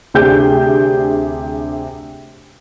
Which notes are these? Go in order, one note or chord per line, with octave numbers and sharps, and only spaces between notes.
D2 C3 D4 G4 G#4 G6